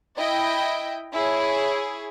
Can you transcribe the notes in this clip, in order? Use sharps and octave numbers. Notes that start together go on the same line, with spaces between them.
E4 D#5 G5
E4 G#4 C#5